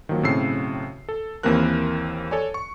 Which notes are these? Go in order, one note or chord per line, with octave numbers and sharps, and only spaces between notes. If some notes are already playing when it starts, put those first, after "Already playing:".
D#3 F3 F#3 A#3
B1 A2 C#3 C4 E6 C7
A4
D#2 E3 A#3 C4 A#4 F#6
A4 C#5 D5 G#5
C#6